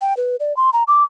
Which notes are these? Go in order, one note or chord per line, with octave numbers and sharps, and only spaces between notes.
G5
B4
D5
C6
A#5
D6